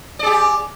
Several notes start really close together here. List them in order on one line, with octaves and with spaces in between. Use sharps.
D5 G#4 G4